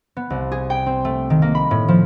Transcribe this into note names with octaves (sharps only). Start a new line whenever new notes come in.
B3
C2
G#4
G5
C4
A3
D#3
A#3
B5
A2
F3